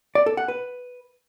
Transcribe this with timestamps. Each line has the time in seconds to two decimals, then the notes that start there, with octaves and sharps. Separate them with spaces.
0.15 D5
0.26 A4
0.37 F#5
0.48 B4